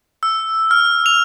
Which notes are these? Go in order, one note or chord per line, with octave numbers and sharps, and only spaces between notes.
E6
F6
F7